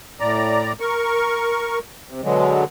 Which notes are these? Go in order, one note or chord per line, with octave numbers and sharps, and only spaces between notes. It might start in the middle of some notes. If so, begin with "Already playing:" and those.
A2 D5 A#5
A#4 C#6
C3
B2 D3 F#3 G#3